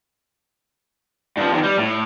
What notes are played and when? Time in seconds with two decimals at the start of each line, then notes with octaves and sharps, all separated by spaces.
1.37 G2 F3
1.52 E2 D#3
1.63 G3
1.78 A2